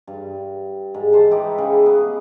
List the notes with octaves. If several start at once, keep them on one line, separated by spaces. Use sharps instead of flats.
G2
G#2
E3 C5 A5
D#4 E4 G4 B4
C#3
B3